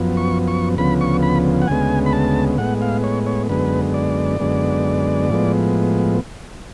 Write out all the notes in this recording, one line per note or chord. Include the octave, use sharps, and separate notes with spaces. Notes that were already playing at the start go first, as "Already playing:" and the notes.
Already playing: F#2 F3 B3
C#6
C#6
D2 C#3 F3 B3 B5
C#6
B5
F#5
D2 C#3 G#3 B3 G#5
B5
A5
A2 G#3 B3 F#5
F5
C#5
C#5
F#2 D3 G#3 B3 B4
D5
F#2 D3 G#3 B3
A2 F3 G#3 B3